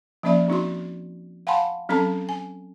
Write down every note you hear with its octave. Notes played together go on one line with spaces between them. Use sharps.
F3 A#3 C#4 D5 E5 B5
C4 D#4 F#4 C6
F5 F#5 G#5 A5 B5 C6
F#3 C4 C#4 A4 A5 A#5
G#5